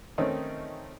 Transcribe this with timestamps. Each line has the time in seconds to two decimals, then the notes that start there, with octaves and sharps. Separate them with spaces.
0.18 D#3 A3 C4 C#4 D#4